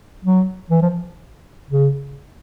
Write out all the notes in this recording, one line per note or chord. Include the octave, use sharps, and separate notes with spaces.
F#3
E3
F3
C#3